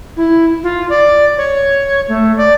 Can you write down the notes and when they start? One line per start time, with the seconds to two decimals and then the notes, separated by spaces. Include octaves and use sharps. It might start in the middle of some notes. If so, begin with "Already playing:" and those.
0.17 E4
0.63 F4
0.90 D5
1.37 C#5
2.08 A3
2.37 D5